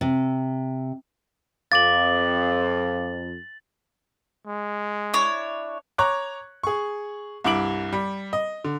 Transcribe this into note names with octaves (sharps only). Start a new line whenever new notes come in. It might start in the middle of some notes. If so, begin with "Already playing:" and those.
C3
F2 F5 D6 A6 F#7
G#3
D4 E4 C#5
C#5 A#5 C#6 D6 F#6
G#4 C#6
C2 G2 E4 D6 D7 F#7
G3
D#5
D3